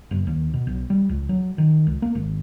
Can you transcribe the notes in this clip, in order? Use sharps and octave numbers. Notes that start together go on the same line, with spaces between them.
F#1
D#2
B2
B1
G3
C#2
F#3
D#3
C#2
A#3
G#1